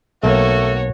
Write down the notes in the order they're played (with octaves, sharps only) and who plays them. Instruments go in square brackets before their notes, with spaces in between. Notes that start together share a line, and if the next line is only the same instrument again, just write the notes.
[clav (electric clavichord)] B1 A#3 [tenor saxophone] A3 [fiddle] F#4 C#5